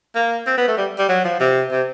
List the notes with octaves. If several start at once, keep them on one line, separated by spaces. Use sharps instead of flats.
A#3
C4
B3
A3
G3
G3
F#3
F3
C3
C3